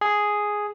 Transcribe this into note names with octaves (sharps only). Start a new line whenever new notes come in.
G#4